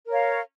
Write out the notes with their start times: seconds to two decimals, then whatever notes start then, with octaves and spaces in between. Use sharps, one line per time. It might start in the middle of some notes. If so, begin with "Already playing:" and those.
0.05 A#4
0.09 C#5
0.12 F5